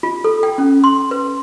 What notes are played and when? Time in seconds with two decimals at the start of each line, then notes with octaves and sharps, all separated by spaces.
0.03 F4
0.24 A4
0.43 G5
0.58 C#4
0.84 C6
1.11 B4